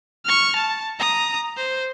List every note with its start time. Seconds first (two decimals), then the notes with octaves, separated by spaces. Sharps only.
0.25 C#6 F6
0.56 A5
0.99 A#5 D#6
1.57 C5